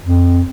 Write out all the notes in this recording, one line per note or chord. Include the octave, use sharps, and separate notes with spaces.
F2